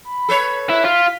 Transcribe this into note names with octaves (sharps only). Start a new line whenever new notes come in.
B5
A4 B4 C#5
E4 F#6
F4 B6